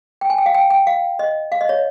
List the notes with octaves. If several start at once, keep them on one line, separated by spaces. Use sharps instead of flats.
G5
G#5
G5
F5
G5
G5
F5
D#5
F5
D#5
C#5